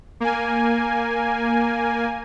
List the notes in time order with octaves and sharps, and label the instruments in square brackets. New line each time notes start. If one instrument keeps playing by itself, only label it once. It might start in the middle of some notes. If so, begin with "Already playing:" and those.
[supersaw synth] A#3 G#5